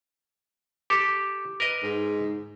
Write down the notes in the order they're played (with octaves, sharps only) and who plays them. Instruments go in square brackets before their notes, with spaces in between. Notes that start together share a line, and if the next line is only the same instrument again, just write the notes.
[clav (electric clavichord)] G4 A4 [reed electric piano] D6
[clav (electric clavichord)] A#4 B4 D#5
[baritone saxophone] G#2